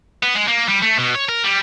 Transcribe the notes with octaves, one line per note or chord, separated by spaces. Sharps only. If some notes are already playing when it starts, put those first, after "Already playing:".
B3
G#3
A#3
G3
A3
B2
C#5
A#4
G3